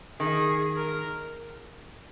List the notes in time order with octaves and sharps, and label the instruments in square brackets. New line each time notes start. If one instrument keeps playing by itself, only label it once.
[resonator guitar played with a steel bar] D#3 [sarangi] G#4
[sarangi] A#4